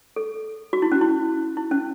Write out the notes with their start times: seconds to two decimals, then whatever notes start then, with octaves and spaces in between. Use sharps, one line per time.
0.16 A4
0.73 F#4
0.82 E4
0.92 C#4
1.01 E4
1.57 E4
1.71 C#4